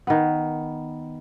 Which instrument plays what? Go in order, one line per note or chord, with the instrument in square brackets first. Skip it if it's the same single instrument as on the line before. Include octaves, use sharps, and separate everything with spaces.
[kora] D#3 B3